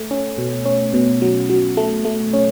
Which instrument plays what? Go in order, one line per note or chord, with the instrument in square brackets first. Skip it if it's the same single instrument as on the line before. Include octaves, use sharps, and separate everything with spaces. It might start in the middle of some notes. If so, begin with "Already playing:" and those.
Already playing: [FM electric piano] A3
C#4
B2
C#4
B2
F#3
F#3
A3
A3
C#4